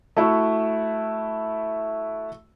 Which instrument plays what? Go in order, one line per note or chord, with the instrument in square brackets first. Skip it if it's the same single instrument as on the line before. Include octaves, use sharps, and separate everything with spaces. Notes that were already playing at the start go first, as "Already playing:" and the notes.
[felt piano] A3 E4 F#4